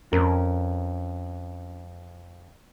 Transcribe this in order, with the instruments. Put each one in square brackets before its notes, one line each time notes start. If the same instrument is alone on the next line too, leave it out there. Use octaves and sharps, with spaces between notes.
[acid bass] F2 [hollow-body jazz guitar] C#4 A#4